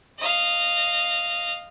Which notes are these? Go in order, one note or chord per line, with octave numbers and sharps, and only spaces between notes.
D#5 F5